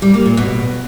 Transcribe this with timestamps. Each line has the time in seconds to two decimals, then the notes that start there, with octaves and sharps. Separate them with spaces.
0.02 G3
0.14 A#3
0.26 A#2
0.37 B2